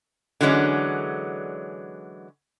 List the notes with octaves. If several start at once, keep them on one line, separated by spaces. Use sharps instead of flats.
D3 E3 F#3 G#3 C#4